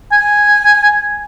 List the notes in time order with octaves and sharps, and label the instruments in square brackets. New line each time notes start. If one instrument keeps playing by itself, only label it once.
[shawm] G#5